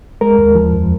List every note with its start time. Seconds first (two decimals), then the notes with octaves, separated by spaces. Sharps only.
0.21 G#3 A#4
0.38 D#2
0.55 F3
0.73 F2